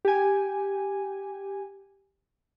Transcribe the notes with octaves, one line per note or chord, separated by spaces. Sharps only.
G4 G#5